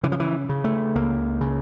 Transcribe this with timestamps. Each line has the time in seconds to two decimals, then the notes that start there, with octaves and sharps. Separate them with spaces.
0.03 C#3 E3
0.12 F3
0.20 E3
0.49 C#3
0.64 A3
0.95 C#2 A#3
1.41 C#3